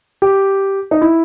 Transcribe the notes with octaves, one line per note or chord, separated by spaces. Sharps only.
G4
D#4
E4